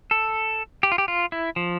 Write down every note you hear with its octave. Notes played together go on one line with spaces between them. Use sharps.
A4
G4
F4
G4
F4
E4
F3